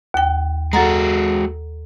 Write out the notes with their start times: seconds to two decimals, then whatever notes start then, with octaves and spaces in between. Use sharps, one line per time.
0.14 D#2 G5
0.73 G#3 F#4 A4 F#5 A#5